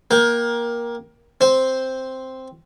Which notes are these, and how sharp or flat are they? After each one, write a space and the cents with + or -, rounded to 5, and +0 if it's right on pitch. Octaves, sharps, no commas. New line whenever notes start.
A#3 +15 A#4 +20 G5 +0
C4 +0 C5 +0